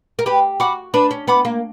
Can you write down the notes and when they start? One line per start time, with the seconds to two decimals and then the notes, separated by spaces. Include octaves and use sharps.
0.19 A#4
0.26 G4 B4
0.60 F#4 F#5 B5 D6
0.94 D4 B4
1.11 C#4
1.27 B3 F#5 B5 D6
1.45 A#3